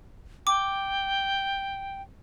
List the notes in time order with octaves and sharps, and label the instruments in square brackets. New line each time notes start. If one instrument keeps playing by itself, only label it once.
[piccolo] G5 [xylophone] D6